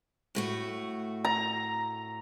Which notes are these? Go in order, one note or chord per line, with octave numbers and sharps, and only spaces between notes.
A2 A3 F#4
A#5